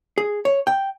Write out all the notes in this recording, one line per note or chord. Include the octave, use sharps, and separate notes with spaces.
G#4
C#5
G5